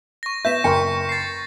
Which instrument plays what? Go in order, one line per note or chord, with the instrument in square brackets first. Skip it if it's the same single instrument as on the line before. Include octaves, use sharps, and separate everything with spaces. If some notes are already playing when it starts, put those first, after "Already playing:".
[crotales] C#6 A#6
[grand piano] B3 E5 [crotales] G6 B6 E7
[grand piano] F#1 A#4 C6 [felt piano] G5 C#6 [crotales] C#7
[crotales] A6 C7